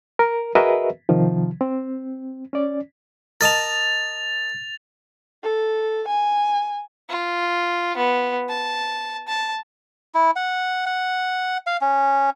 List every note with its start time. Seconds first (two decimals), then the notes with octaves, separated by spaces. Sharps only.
0.19 A#4
0.55 F#4 G#4 A#4 B4 D#5 E5
1.09 C3 D#3 F3
1.61 C4
2.53 C#4 D5
3.41 A#4 D#5 A5 A6 F7
5.44 A4
6.08 G#5
7.09 F4
7.97 B3
8.49 A5
9.28 A5
10.15 E4
10.36 F#5
10.86 F#5
11.67 F5
11.81 C#4